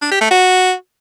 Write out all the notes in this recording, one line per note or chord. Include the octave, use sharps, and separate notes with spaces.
D4
G4
A3
F#4